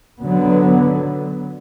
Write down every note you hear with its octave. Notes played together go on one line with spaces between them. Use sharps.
D3 F#3 B3